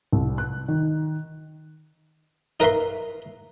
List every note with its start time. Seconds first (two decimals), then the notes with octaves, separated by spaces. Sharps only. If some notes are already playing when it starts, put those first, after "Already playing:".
0.13 C2
0.38 F#6
0.68 D#3
2.60 D#4 A#4 B4 E5 C6